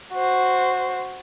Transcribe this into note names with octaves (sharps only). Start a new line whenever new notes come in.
F#4 C5